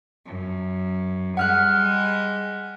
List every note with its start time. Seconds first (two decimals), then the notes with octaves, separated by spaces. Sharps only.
0.25 F#2
1.37 G3 G#3 F#5 F6 F#6